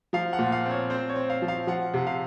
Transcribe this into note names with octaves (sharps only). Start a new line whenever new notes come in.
F3 F5
F#5
A#2
F5
C4
C#5
C4 C5
C#5
C4
F5
F3
F5
F3 F#5
C3 F#5
F5